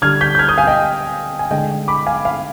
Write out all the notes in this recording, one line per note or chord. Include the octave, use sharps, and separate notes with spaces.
D3 G3 F6 G#6
G6 B6
G6
F6 G#6
D#6 G6
F5 G#5
D#5 G5
G#5
D3 G#3 D#5 G5
B5 D6
F5 G#5
F5